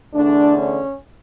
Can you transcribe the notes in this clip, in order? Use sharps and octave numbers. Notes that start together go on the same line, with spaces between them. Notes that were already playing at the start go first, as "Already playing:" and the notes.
E2 D3 A3 D4
C#4